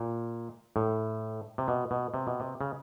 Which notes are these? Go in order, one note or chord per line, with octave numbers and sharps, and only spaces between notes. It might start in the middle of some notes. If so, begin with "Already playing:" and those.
Already playing: A#2
A2
C3
B2
B2
C3
B2
C3
C#3